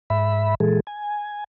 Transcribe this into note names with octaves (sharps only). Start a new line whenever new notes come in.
G#2 E5 B5
A#2 E3 G#3 G#4 A4
G#5